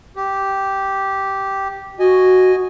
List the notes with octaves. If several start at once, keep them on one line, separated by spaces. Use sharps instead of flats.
G4
F#4 D#5 G#5